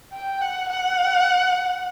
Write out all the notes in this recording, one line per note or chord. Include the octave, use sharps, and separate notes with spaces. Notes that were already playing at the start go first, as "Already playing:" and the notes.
G5
F#5
F#5